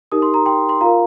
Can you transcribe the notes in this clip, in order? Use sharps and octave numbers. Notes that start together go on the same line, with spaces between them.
D#4 G4 A#4 D#6
C6
A#5
G5 C6
C6
F4 A#4 F5 A#5